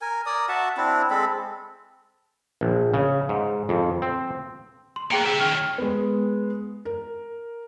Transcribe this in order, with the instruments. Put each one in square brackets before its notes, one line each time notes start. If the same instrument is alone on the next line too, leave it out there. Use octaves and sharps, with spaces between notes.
[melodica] A#4 G#5
A#4 D5 D#6
F#4 E5 F#5 A5
C4 D4 E4
G#3 C4 A4 B5
[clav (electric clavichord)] A#1
C#3
G#2
F2
C4
[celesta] C6
[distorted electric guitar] A#3 B3 [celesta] G#4 G5 C#7
[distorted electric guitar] G4 E5
[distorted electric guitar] D#3 C#4 [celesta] G5 F6
[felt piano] G#3 B3
A#4